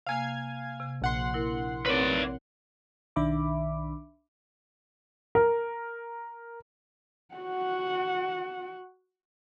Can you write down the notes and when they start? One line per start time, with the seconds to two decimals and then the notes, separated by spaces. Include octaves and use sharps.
0.07 C3 A#3 F5 G#5 G#6
0.80 C3
1.02 A#1 F#5 C6
1.34 E4 A#4
1.86 C4 A#4 B4 C#5 D5
3.16 B1 D#3 D4 E5 B5 D6
5.35 A#4
7.35 F#4 F#5